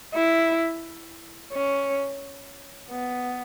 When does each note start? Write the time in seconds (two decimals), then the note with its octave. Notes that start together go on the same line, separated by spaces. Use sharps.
0.15 E4
1.52 C#4
2.91 B3